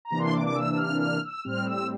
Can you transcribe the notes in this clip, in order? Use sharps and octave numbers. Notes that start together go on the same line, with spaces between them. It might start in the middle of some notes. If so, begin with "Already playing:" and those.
A#5
C3 E3 A#3 D4
C6
D6
D6
E6
E6
F6
F6
E6
A2 G3 C4 F6
E6